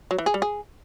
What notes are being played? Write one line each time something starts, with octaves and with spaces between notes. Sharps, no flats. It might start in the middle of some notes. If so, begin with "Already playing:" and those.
F#3
E3
G#4
G3
G#4